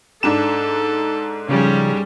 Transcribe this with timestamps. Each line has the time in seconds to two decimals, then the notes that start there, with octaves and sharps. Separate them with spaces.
0.23 G#2 D4 A4 E7
1.49 C#3 F3 G3 C#4 G#4